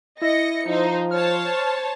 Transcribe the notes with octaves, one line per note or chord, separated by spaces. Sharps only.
E4 D#5 A#6 C#7
F3 D#4 C5
C5 C#5 A5 F6